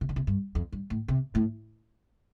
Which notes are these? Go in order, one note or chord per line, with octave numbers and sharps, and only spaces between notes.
C3
D3
C3
G2
F2
G2
A2
C3
A2